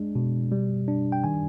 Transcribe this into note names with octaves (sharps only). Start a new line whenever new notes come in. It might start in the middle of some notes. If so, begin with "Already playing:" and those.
Already playing: G#3 D4
B2
G3
D4
G5
D#3 G#5